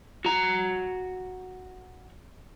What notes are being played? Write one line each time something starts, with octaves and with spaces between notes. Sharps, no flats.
F#4 A#5